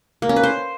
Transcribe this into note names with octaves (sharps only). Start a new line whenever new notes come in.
A#3
C#4
B4
C5